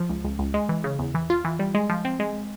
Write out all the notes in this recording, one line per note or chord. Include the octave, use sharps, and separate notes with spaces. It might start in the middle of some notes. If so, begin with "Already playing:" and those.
Already playing: F3
C#2
C#2
C#2
G#3
E3
C#3
E2
E3
F4
E3
G3
G#3
F3
C4
G#3